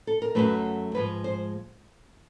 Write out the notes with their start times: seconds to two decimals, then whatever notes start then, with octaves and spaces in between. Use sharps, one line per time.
0.07 A4
0.22 A#4
0.35 F#2 D3 F#3 A3 B4
0.95 G#2 F3 G#3 B4
1.24 C5